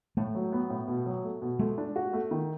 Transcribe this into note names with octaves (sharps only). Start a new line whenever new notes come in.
A2 A3
F#3
B3
A2
B2
F#3
A3
B2
G#3 A3
D4
F#4
A3
D#3